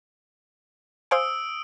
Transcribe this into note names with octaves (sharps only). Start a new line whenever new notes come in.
C5 F5 G#5 D#6 E6 D7